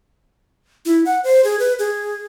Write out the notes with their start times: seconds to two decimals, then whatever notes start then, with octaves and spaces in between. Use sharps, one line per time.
0.85 E4
1.05 F#5
1.24 C5
1.44 G#4
1.59 B4
1.79 G#4